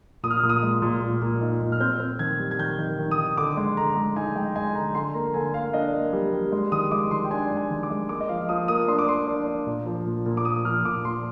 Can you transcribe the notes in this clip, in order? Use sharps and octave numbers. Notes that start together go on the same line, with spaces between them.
A#2 D#6
F6
D#6
A#2
D#6
G#3
A#2
A#2
A#2
D#4
A#2
F6
C4 G6
C4
D#3 G#6
G3
G#6
D#3 G6
D#3
D#3
D#6
D#3
D3 D6
G#3
D3 A#5
G#3
D#4 G#5
G#3 G5
G#3 G#5
D3 A#5
D3 C6
A#3 A#5
D3 G#5
A#3 F5
D4 D#5
A#3
G3
G3
G#3
D#3 D#6
G#3 D6
D#3 C6
G5
D4 G#5
G#3
G#5
D#3
D6
G#3
A#3 D6
D#5
F3 F5
F3 D#6
A#3 D#6
D4 C6
D6
A#3 C6
D4
D4
A#2
F3
A#2
A#2
D6
A#3 D#6
F3 F6
A#2 D6
A#2 C6